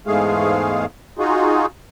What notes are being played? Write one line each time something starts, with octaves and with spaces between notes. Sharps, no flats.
E2 G#2 G#3 A3 G#4 F5
D#4 F4 F#4 G#4